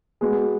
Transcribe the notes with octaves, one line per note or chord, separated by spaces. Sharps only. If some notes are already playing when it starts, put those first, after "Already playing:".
G#3 B3 F#4